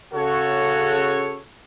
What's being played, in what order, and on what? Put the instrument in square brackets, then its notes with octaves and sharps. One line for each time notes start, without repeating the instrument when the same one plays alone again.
[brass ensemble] C#3 F#4 A4 C#5